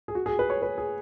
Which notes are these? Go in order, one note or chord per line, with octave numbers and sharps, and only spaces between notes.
G#4
F#4
G#4
B4
C#5
B4
G#4